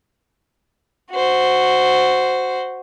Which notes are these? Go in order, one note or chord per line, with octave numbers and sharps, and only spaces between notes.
F#4 C5